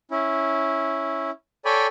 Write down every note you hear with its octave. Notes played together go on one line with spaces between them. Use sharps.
C#4 E4
A4 C#5 D5 G5 G#5 B5